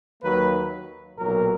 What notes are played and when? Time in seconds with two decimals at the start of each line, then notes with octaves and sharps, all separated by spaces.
0.23 D#2 D#3 F#3 A#3 B4
1.18 B1 A#2 F#3 A#4